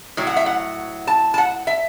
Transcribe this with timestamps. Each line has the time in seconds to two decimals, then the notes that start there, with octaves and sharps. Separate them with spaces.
0.17 A2 F#3
0.27 F#5
0.36 E5
0.46 F#5
1.07 A5
1.34 A5
1.38 F#5
1.67 E5